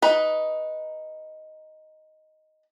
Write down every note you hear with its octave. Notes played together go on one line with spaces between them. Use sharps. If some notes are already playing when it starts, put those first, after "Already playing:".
D#4 B4